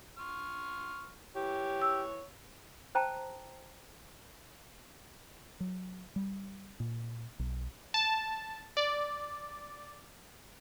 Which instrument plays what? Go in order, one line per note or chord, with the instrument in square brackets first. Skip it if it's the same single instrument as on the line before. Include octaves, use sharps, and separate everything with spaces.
[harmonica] C6 C#6 F6
[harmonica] E3 C#5 [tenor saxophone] G4
[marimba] E6
[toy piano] C5 G5 A5 A#5
[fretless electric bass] F#3
G3
A#2
B1
[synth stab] A5
D5